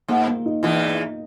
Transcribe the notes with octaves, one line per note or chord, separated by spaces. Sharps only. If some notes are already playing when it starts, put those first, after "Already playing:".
G#2 A#3
A#3
D#4
E2 E3 D#4